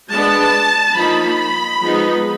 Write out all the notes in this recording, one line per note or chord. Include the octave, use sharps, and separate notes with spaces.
G#3 B3 D4 A5
F3 A#3 D#4 B5
F3 G#3 B3 D#4